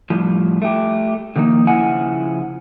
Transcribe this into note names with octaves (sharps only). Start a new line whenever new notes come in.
A2 F3 G3
A3 G4
D3 D#3 F3 A#3 D#4
C#3 F3 E4 F#5 G#5